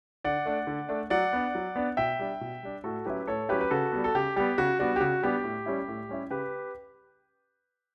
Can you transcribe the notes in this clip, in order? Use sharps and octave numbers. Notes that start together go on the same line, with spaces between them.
D3 D5 F#5
A3 D4
D3
A3 D4
F#3 D5 F#5
B3 D4
F#3
B3 D4
B2 E5 G5
G3 D4
B2
G3 D4
A2 F#4 A4
F#3 C#4 E4 G4 B4
A2 A4 C#5
F#3 C#4 E4 G4 B4
B4
C#3 F#4 A4
G3 B3
A4
C#3 G4
G3 B3 G4
C#3 F#4
G3 B3 D4 F#4
G4
C#3 F#4
G3 B3 D4 G4
A2
G3 C#4 E4
A2
G3 C#4 E4
C#3 G4 B4